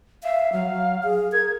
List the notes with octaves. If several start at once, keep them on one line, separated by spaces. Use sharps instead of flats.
E5 F5
F#3 F5
G#4
A#4 G#6